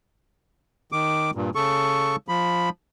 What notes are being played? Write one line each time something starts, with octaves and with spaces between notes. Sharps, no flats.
D#3 D6
G2 A#2
C#3 A4 C#6
F3 B5